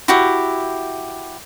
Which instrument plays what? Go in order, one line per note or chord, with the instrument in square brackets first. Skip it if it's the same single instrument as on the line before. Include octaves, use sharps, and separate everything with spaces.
[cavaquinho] E4 F#4 G4